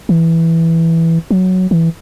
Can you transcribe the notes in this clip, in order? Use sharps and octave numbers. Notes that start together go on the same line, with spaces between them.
E3
F#3
E3